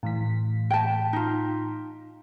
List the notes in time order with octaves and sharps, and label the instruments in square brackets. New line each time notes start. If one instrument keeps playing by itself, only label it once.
[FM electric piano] A2 E3 B6
[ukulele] G5 A5
D#4 F4